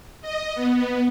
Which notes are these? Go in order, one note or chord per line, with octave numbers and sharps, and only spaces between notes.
D#5
B3